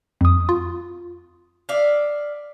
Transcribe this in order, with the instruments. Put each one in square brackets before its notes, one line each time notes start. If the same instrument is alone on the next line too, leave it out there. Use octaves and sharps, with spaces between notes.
[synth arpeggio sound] F2 D#6
F4
[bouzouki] D5 E5 F5